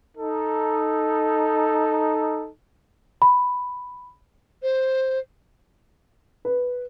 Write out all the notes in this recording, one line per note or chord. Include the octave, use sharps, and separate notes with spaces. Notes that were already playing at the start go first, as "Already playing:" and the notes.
D#4 A4
B5
C5
B4